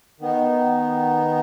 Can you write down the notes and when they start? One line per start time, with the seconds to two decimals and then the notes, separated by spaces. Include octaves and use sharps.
0.20 D#3 B3 D#4